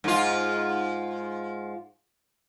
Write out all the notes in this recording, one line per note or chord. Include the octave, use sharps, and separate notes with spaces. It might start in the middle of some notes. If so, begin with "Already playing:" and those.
G#2 F4